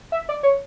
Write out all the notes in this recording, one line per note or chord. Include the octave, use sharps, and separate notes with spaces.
E5
D5
C#5